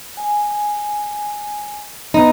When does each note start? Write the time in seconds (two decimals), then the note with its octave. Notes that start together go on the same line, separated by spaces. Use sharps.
0.17 G#5
2.14 B3 D#4 B4